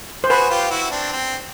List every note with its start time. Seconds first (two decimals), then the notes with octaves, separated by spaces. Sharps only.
0.24 C5
0.30 F#4 G#4 B4
0.50 F4 G4
0.71 E4 F#4
0.91 C4 D4
1.12 C4